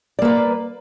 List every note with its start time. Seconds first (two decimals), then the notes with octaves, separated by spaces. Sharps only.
0.19 D5
0.22 A#3
0.25 B4